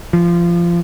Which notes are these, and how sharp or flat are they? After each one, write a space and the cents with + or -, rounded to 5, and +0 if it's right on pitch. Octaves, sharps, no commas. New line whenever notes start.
F3 -20